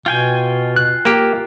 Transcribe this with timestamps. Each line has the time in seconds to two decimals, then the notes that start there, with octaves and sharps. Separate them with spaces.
0.06 B2 F4 G5 G#5
0.76 F#6
1.05 A#3 G4